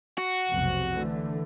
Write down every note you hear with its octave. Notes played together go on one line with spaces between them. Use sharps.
F#4
F1 B1 C3
D3 E3 A3